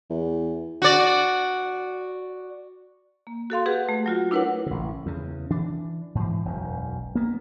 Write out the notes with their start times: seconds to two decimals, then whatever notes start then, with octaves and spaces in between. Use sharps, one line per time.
0.10 E2
0.82 F#4 D5
3.27 A#3
3.50 F#4 A4 F5 C6
3.66 G4 G#4 B4 F#5
3.89 A3
4.06 F#3 F4 F#4
4.31 D4 E4 A#4 B4 C#5 F#5
4.66 A1 C#3
5.06 E2 C#3
5.50 E3 D4
6.15 G#2 E3
6.45 E1 B1 F#2
7.15 A#3 B3